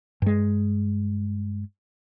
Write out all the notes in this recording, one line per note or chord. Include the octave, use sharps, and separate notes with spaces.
G2 G#3